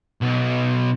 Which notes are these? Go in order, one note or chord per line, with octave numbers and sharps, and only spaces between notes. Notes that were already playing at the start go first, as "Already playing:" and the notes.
B1